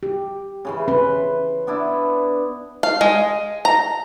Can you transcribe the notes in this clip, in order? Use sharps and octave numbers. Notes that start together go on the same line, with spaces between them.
G4
C#3 E3 C6
C#4 B4 C6
B3 D4 E4
F5
G#3
A#5